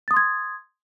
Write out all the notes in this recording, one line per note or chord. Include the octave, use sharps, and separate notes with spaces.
C6 D#6 G#6 A6